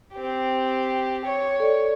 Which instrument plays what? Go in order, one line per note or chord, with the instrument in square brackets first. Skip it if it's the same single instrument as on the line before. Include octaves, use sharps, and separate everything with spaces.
[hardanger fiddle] C4 G4
C#5
[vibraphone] A4 D5